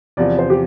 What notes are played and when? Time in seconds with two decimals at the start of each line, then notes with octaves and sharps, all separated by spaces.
0.17 E2 C3 F3 D5
0.39 C5
0.50 G4